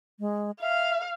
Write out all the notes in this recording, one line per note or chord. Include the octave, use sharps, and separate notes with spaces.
G#3
E5 F5